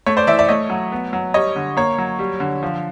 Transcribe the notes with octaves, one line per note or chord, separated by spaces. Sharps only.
A3 C#5
C5 D5
E3 D5 E5
D5 E5
A3 C#5 D#5
F#3
B3
F#3
G3 C#5 D#5
D3
A#3 C#5
F#3
G3
D3
F3